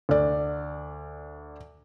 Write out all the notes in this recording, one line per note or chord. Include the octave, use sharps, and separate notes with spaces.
D2 D5